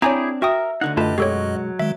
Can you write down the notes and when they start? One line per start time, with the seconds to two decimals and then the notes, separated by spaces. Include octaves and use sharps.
0.02 C4 D4 E4 G4 G#4 C#5 G#5 A#5
0.42 F#4 A#4 E5 G5 D#6
0.81 D2 D3 D#4 F#5
0.97 F#2 A3 F4 G4 A4 B4 D#5 A5
1.18 B2 F#3 G#3 G4 A4 C#5 C#6
1.79 D#3 G#3 E5